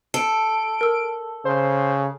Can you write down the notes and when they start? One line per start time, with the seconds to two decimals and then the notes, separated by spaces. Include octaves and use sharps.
0.14 A4 D7
0.81 A#4 E6
1.45 C#3 C5